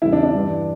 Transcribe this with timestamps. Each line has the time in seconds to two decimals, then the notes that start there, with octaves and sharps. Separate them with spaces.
0.02 E2 C#3 G3 E4
0.13 D4
0.23 D4
0.33 G2 E3 G3